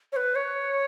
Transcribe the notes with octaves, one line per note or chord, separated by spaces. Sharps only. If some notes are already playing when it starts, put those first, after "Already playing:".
C#5
B4
C#5